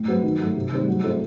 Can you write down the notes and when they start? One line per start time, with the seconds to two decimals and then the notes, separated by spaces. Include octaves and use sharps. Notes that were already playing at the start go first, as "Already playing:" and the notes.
Already playing: A2
0.08 F#3 C4 F#4 B4
0.23 D#3
0.40 F#3 A3
0.56 C3
0.72 D#3 G3 C4
0.88 F#3
1.04 C4 E4 A4